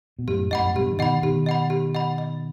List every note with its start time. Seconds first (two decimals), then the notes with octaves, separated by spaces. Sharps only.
0.19 B2
0.28 F#2 A2 G4
0.51 F#2 A2 D#5 F#5 B5
0.65 A2
0.75 G2 B2 G4
0.92 E3
0.99 B2 D#3 D#5 F#5 B5
1.22 B2 D#3 G4
1.46 D#5 F#5 B5
1.70 G4
1.95 D#5 F#5 B5
2.18 D#5